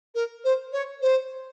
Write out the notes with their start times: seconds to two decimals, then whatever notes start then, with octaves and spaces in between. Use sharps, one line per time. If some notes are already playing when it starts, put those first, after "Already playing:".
0.15 A#4
0.44 C5
0.73 C#5
1.02 C5